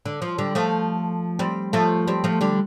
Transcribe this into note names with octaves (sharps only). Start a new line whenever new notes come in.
D3
F3
D3 G3
F3 A3
G3 C4
F3 A3
G3 C4
F3 A3
D3 G3